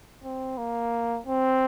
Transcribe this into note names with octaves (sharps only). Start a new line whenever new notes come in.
C4
A#3
C4